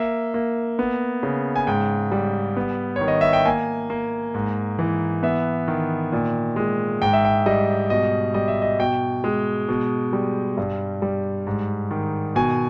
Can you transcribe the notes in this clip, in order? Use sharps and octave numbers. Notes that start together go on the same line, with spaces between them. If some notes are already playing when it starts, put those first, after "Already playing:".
Already playing: A#3 E5
A#3
B3
C#3
G#5
G#2 G5
G3
B3
C#5
D#3
D#5
E5
G5
A#3 G#5
A#3
G#2
E3
B3 E5
D#3
A#2
G#3
G#2 G5
E5
G5
G3 D#5
B2 D#5
G3 D#5
E5
D#5
B2 G5
G#3
B2
G3
G2
G3
G#2
D#3
B2 G#5